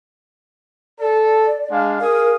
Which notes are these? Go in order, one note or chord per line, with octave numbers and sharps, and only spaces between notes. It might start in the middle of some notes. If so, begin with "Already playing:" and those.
A4 D5
G#3 D4 F5
G#4 A#4 F5 D#6